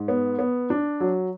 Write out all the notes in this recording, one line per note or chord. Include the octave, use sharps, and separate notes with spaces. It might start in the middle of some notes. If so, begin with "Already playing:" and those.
Already playing: G#2
B3
B3
D4
F#3